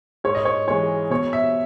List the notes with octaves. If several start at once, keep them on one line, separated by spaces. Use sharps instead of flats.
G#2 C#5
D#5
C#5
E3 G#3 C#5
B2 C#5
E5